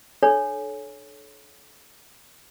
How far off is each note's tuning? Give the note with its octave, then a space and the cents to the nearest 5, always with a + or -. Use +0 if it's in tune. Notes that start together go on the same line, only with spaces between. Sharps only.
D4 +45 A4 -30 C#5 +5